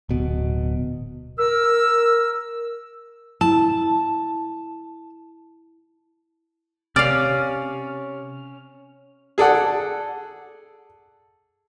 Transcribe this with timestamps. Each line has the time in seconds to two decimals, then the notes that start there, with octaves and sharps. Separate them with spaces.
0.09 D1 B2
1.38 A#4 E6
3.41 E4 A5
6.96 C3 C#4 D5 F5 F6
9.38 G#4 A4 D5 F#5